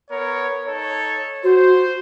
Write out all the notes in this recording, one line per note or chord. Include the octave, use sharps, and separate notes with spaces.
B3 A#4 C#5
D#4 A4 C#5
F#4 C5